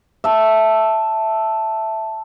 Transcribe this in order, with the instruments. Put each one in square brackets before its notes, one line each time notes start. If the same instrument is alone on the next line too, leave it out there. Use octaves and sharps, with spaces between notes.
[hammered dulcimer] E5 A5